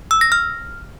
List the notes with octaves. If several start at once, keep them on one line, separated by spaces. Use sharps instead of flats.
E6
A#6
F6